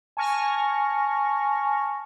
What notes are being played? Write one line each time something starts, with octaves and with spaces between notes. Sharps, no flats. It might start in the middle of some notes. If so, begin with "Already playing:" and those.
G#5 A5 C#6 F6 A#6